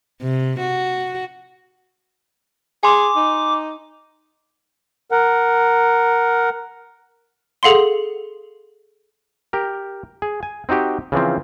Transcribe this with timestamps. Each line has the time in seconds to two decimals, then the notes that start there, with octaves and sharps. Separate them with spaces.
0.22 C3
0.60 F#4
2.83 G#4 G#5 C6 D6
3.16 D#4
5.11 A#4 F#5
7.63 G#4 A4 F5 F#5 C6
9.53 G4 A#4
10.22 G#4
10.43 G#5
10.69 C4 D#4 F#4 G4
11.12 C#3 E3 F3 C4